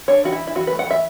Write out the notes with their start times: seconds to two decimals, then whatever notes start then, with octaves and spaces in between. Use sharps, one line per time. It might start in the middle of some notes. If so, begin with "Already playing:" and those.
0.08 D4 C#5
0.24 E3 F#4
0.32 E4
0.40 D4
0.47 E4
0.55 E3 F#4
0.67 A3 B4
0.79 F#5
0.87 E3 E5